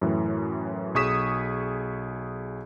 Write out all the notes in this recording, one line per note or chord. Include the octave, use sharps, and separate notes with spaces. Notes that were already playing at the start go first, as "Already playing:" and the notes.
F#2 A2 E3
B1 G#4 C#6 D#6 B6 E7